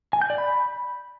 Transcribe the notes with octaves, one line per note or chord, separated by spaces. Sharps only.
G#5
G6
D5
B5